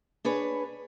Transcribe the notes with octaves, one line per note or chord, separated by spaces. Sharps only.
D4 G#4 B4 C#5